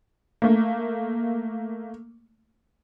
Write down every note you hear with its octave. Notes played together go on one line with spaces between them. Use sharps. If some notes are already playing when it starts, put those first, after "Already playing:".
A3 A#3